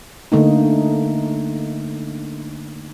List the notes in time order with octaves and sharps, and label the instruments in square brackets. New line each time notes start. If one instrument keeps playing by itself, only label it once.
[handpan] D3 A3 A#3 D#4